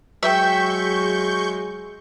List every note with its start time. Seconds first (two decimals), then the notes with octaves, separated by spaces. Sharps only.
0.23 F#3 G#3 E5 G5 C#6 G6